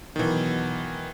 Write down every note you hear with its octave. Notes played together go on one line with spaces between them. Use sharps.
B2 D#3 E3 F#3